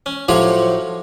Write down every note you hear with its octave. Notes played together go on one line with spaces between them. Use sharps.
C#4
A2 F3 F#3 G4 C5 C#5